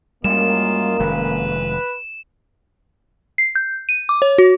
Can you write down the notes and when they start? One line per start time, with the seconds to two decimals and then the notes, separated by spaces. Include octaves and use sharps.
0.24 F#2 G3 G#3 A#3 F4 D#5 E7
1.00 F1 D#3 G#3 B4
3.38 C7
3.55 G6
3.89 D#7
4.09 D6
4.22 C#5
4.38 F#4